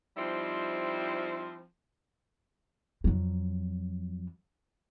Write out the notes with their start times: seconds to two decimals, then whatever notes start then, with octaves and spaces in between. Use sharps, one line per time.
0.17 F3 G3 C4 D#4 E4
3.04 F2 F#3